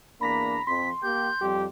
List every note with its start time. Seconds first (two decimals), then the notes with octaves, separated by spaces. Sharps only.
0.21 E2 A#3 D4 A#5 B5 A#6 B6
0.67 F2 C6 B6
1.03 A#3 G4 G6
1.41 F2 G3 G4